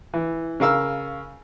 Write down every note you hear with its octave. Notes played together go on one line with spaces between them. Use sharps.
E3
C#3 A#4 F5 E6 F6